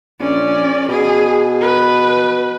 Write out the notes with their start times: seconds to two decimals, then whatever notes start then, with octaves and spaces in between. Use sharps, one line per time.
0.20 A#1 C#4 D5
0.89 B2 G#4
1.61 B4